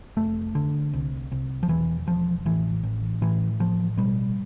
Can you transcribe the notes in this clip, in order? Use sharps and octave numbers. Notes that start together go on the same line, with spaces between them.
F1 A3
D3
C2
C2
F3
E1 E3
E1 F3
A1 E3
A1
A2 E3
A2 F3
B2 G3